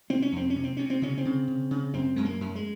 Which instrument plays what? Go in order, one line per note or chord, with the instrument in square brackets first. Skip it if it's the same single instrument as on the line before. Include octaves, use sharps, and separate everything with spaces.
[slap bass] C3 C4
C#4
F2 C4
C#4
C3
C4
C3 C#4
C4
C#3 C#4
C4
C#3
C#3
C#3
F#2 C4
F#2 G#3
A#3
F#2
G#3